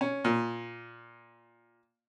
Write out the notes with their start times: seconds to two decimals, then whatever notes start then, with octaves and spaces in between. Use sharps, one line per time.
0.01 C#4
0.25 A#2